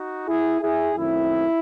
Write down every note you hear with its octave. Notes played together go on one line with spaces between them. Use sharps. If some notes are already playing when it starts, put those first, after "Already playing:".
Already playing: D#4 F#4
E4 G#4
E4 G#4
F#2 D#3 A3 C4 E4